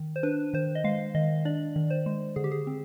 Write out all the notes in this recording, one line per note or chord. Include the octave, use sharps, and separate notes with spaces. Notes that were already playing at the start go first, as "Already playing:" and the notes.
Already playing: D#3
C5
D4 B4
D#3 C5
D#5
G#3 F5
D#3 D#5
D4 D5
D#3
C5
G#3
D3 G#4
G4
G#4
C4